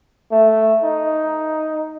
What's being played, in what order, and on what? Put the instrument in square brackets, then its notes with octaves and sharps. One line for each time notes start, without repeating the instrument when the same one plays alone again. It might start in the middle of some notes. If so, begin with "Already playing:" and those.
[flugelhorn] A3
D#4